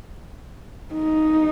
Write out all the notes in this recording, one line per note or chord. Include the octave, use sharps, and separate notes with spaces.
D#4